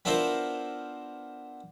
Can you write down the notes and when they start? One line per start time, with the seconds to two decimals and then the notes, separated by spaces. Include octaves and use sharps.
0.05 B3 D4 E4 F4 A#4 C5